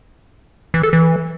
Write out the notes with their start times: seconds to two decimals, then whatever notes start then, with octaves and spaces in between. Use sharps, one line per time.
0.74 E3
0.83 A4
0.93 E3